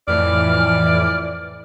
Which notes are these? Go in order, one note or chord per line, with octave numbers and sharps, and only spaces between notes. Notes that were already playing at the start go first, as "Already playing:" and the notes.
F2 A2 E3 D5 F6